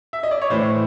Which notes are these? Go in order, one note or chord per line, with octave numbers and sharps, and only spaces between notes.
E5
D#5
D5
C#5
A2 E3 C5